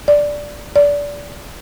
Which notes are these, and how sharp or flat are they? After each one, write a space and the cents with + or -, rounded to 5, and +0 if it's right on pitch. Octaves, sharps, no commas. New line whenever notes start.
D5 -5
D5 -20